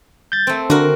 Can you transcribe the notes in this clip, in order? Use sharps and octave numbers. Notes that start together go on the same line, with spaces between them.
G6 A6
A3 C4
D3 F#4 A#4